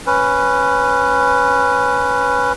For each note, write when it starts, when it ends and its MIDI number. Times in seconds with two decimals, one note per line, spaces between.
0.06 2.53 61
0.06 2.53 71